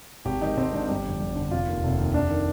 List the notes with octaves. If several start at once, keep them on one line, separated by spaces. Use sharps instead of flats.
G#1 G4
G#2 D#3 D#4
G#1 C4
G#2 D#3 D4
G1 G4
F2 D3
G1
F2 D3
F1 F4
D#2 D#3
F1
D#2 D#3
F1 D4
D#3